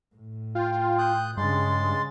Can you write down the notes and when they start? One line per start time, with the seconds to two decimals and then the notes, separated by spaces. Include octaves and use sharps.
0.15 A2
0.55 F4 G5
0.98 D#6 F#6 G6
1.37 G2 C#3 G#3 C6 A6